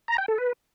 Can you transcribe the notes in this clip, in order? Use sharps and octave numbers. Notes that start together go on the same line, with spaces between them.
A#5
G5
A4
B4